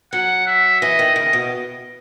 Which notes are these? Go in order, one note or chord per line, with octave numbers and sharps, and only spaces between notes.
F#3 F#5
E5
E3 D#5
D#3
C#3 D#5
B2